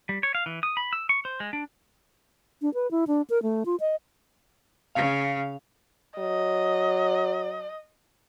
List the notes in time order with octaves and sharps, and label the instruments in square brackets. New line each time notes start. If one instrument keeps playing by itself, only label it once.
[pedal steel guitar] G3
C#5
F5
E3
D#6
B5
E6
C#6
C5
G#3
D4
[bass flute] D4
B4
E4
D4
A#4
A3
F4
D#5
[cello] C#3 [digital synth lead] F5
[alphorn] F#3 [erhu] D#5